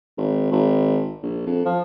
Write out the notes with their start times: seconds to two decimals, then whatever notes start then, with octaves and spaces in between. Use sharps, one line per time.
0.18 G#1
0.52 G#1
1.23 A#1
1.46 F2
1.65 F3